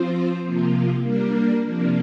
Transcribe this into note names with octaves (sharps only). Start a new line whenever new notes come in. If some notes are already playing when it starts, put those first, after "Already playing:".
Already playing: F3 C4 F4 C5
C3 F3 A#3 F4
G3 A#3 D4 A#4
C3 F3 A#3 D4